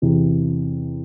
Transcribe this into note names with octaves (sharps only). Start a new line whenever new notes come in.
E2 C3 E3